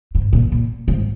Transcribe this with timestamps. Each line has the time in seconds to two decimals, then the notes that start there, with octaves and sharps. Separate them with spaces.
0.15 G#2
0.33 A#2
0.52 A#2
0.88 G#2